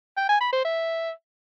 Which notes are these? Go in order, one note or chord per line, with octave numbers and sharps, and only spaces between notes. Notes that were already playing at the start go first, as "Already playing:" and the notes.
G5
G#5
B5
C5
E5